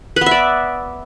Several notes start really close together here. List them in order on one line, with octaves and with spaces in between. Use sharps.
B4 B3 E5 D5